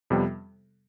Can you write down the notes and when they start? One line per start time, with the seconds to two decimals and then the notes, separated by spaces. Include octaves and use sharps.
0.10 F2 C3 G3 B3